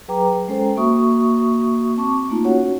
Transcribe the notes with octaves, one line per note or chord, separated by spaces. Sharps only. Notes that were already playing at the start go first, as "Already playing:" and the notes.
F#3 G#4 B4 G5 A#5 D6
G#3 C#4 A4 C5 G5 A#5
A#3 F#4 E5 C#6 D#6
C4 A5 C#6 D6
A3 A#3 D#4 F4
C#4 F#4 C#5 F#5